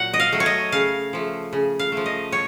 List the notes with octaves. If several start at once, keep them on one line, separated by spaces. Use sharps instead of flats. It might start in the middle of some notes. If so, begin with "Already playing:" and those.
Already playing: A#2 F#3 F#5
D#5
F5
F#3 A3
C#5
D#5
C#3 F5
F3 A3
C#3
F5
F3 A3
D#5
A2 C#5